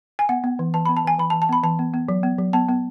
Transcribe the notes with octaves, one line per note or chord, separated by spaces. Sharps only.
G#5
B3 F#5
B3
E3
E3 A5
B5
B3
A5
E3 G#5
E3 B5
A5
E3
A5
B3 B5
E3 A5
B3
B3
F#3
B3
F#3
B3 A5
B3